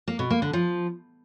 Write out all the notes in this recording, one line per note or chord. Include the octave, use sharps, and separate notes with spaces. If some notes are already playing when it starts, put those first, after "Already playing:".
A#3
B2
A#3
D3
F3